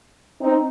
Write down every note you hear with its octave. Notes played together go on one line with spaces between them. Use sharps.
C4 D#4